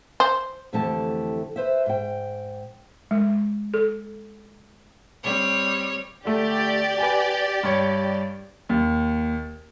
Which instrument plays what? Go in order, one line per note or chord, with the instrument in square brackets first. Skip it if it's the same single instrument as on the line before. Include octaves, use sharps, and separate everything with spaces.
[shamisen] C5
[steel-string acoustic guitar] F2 D3 E3 A3 G4 A5
B4 C5 E5
G#2 G5
[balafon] G#3
A4
[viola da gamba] G3 C4 [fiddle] C#5
[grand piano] D3 A3 [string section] G4 D5
[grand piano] B4 G5 G#5
G2 C#5
D#2